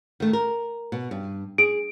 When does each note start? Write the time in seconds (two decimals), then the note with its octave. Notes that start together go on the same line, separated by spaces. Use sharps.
0.20 D#3 A3
0.33 A#4
0.92 B2
1.11 G2
1.58 G#4 D7